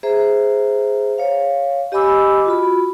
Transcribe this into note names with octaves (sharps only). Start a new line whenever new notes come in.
G#4 C5 E5 A#5
C#5 F5
G4 D#5 G#5 B5 D6 E6
F4 F#4 B5